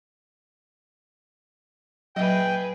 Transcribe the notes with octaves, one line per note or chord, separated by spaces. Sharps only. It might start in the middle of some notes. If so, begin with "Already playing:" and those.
A#2 F#3 G#4 B4 D#5 G5